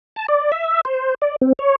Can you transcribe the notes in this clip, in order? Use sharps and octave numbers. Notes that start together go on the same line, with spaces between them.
A5
D5
E5
C5
D5
C4
C#5